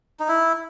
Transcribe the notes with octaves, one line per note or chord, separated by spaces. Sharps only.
D#4
E4